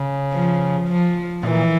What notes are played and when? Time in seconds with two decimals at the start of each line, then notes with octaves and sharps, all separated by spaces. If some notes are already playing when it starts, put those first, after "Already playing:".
Already playing: C#3
0.32 F3
0.88 F3
1.43 A#2 E3